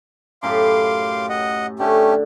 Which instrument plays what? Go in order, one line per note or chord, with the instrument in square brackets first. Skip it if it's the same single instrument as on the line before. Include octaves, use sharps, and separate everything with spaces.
[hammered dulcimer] F#2 A2 G4 [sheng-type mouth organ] F5 C6 D6
[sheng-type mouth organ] D#5 F#5
[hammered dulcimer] D3 [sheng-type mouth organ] A3 C#4 G4